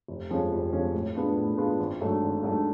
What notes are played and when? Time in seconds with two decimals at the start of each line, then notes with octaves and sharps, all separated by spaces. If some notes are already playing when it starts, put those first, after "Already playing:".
0.08 F1
0.30 F2 F3 G#3 C#4
0.52 F1
0.73 F2 F3 G#3 C#4
0.94 A2
1.15 G#3 B3 D4 F4
1.36 A2
1.57 G#3 B3 D4 F4
1.79 G#1
2.00 G#2 F#3 A3 D4
2.22 G#1
2.43 G#2 F#3 A3 D4